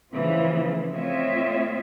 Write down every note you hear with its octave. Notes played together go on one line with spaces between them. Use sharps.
C#3 E3 F3 A3 C4 F4
A3 C4 F4 C#5 D#5 E5